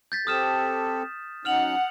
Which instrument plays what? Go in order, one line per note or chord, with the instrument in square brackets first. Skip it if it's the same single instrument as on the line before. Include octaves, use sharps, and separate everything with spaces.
[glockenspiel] G6 A6 B6
[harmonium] C4 G4 A4 [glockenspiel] D#6 F6 E7
[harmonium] F#3 C#4 D#4 [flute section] F#5 [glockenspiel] F6 F7 F#7